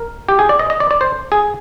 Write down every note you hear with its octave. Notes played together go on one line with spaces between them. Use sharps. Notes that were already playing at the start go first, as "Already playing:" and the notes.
Already playing: A#4
G4
G#4
D5
D#5
D#5
D5
D5
C5
G#4